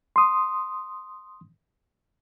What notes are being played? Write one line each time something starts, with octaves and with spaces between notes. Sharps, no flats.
C6 D#6